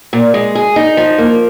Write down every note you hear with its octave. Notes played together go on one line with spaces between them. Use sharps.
A#2
G#3
G#4
D#4
F3
A#3